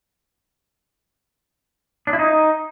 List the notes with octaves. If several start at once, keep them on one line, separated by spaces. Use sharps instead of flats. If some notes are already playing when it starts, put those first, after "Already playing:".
D4
E4
D#4